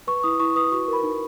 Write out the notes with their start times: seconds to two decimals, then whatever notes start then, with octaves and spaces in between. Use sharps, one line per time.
0.07 B4 C#6
0.23 E4 D#6
0.40 E4 C#6
0.56 B4 D#6
0.72 F#4 C#6
0.88 A#4 B5
1.03 D#4